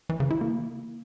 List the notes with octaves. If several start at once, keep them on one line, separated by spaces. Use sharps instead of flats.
E3
C#3
E4
A#3